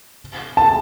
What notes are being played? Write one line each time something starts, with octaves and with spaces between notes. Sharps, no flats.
A5